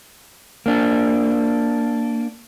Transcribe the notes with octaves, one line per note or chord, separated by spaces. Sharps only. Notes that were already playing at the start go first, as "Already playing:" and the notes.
A#3 D4